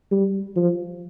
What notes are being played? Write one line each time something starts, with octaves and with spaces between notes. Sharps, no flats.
G3
F3